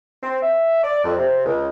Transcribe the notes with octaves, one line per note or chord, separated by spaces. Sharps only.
C4
E5
D5
F2
C3
C#2